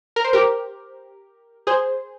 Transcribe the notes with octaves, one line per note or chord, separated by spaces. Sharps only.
A#4
C5
G4 A#4
G#4 C5